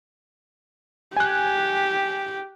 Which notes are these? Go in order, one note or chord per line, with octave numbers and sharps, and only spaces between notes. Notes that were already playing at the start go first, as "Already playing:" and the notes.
G4 G#5 F#6